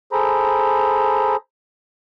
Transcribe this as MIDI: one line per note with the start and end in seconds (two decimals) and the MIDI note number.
0.12 1.36 68
0.12 1.36 69
0.12 1.36 72
0.12 1.36 82
0.12 1.36 83